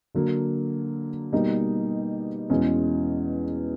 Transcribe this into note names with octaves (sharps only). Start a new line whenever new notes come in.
D3 F#3 A#3
B2 G3 A#3 D#4
E2 B2 G#3 C#4